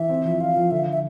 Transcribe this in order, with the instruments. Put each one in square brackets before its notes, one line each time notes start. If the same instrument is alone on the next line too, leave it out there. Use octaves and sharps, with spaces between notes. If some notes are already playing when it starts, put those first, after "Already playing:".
Already playing: [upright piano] E3 [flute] E5
[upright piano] C4
F3
[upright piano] F4 [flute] F5
[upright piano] F3
[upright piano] D3 [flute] E5
[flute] E5